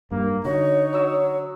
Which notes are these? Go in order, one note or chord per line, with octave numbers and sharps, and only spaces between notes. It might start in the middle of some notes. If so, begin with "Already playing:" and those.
G2 A#3
D3 D#4 F#4 C#5
F#3 D#6 E6